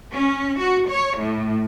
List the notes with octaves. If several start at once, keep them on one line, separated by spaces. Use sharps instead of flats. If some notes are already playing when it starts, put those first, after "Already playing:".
C#4
F#4
C#5
A2